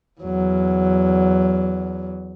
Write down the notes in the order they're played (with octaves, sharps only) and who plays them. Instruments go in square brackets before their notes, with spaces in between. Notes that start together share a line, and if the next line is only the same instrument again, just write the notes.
[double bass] E2 F#3